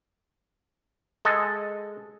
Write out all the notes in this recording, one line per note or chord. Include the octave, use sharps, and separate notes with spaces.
G#3 A4 D#5